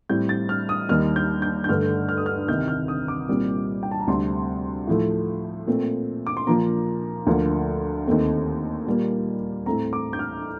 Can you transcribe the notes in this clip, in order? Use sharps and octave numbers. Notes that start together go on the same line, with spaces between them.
A2 G3 C4 G6
A6
F6
D#6
D#2 D#3 G3 F6
G6
G6
G6
G2 D3 A3 F6
F6
D#6
F6
C2 C3 D#3 G6
F6
D#6
D6
C2 A#2 G3 C4
G5
A5
A#5
D2 C3 G3 C4 C6
A2 F3 A3
A#2 A3 C4
D6
C6
A#2 F3 A#3 A#5
D2 D3 F3 A#3
D#2 D#3 A3 C4
A#2 G3 A#3
A2 A3 C4 A#5
D6
G6
F6